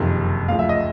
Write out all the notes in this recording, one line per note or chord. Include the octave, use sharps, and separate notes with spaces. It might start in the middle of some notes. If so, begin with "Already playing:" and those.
Already playing: F#1 F2 C3 D#3
D2 C#3 F3 F5
E5
D#5